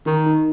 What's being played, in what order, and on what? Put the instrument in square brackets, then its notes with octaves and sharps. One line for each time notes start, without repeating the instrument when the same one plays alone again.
[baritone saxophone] D#3 [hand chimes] D#4
[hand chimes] D#4